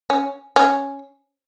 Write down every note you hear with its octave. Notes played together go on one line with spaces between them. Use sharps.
C#4
C#4